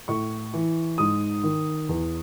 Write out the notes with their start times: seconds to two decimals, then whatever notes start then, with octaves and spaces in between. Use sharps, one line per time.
0.08 A2 C#6
0.53 E3
0.98 G#2 D#6
1.43 D#3
1.89 E2